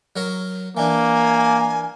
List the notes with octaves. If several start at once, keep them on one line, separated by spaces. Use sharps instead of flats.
F#3 A#4 C#5
E3 A#3 D4 G#5